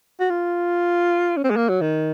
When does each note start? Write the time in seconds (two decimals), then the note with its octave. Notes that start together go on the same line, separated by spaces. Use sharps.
0.20 F#4
0.30 F4
1.37 C#4
1.44 C4
1.50 G#3
1.56 A#3
1.69 F#3
1.81 D#3